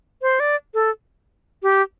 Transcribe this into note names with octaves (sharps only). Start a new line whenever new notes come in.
C5
D5
A4
G4